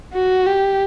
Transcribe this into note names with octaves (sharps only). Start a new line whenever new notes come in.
F#4
G4